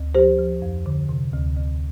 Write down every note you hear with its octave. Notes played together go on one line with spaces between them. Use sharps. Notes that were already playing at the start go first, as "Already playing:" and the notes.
Already playing: D2
F3 G4 C5
F3
F2
D3
C3
D2
D2